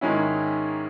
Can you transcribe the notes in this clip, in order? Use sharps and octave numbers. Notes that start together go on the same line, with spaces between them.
G#2 D#3 G#3 C#4 E4